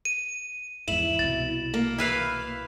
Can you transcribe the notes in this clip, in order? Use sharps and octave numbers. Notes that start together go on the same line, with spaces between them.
D#7
E2 G#2 E4 E7 F#7
C2 B2 A6
A#3
E4 B4 F5